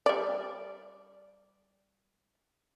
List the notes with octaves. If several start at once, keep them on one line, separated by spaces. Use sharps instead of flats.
G3 D5